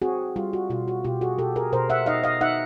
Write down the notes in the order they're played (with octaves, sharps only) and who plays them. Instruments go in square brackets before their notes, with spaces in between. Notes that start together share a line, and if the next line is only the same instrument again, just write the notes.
[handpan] C4 F#4 G#4
G3 F4
F#4
B2 F4
F#4
B2 F4 G4
F#4 G#4
B2 G4 A4
G#4 A#4
B2 A#4 C5
E5 F#5
D#4 D#5 F5
D#5 F5
D#4 E5 F#5